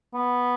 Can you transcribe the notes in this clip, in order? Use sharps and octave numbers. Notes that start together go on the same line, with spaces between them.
B3